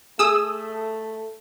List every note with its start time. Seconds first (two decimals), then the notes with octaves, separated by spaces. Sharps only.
0.19 A3 G#4 D#6 E6